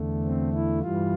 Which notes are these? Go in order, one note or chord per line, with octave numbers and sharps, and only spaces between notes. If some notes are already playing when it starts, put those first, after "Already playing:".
Already playing: E2 D3 A3
C4
E4
G2 E3 G3 F4